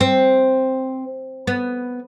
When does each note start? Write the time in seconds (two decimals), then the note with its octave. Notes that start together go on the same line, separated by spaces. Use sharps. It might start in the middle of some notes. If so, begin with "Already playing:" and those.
0.01 C4
1.47 B3